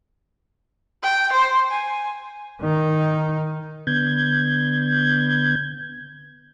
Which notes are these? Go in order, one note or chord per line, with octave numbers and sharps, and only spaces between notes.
G5
C5
G#5
D#3 D#4
D3 B3 G6 G#6